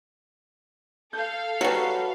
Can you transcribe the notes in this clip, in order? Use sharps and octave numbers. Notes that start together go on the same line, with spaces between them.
A4 F5 G6
F#3 G3 F#4 B4